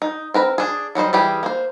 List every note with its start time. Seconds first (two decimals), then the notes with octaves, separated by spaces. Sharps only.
0.02 D#4
0.34 C4 A#4 B4
0.58 D4 G#4
0.95 F#3 G3 D#4 C5
1.13 E3 G3 G4 G#4
1.43 A#3 C5